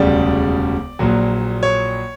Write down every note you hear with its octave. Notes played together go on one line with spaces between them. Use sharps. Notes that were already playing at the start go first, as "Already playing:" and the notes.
Already playing: E1 D2 C#3 G3 D5
A#1 A#2 F#3
C#5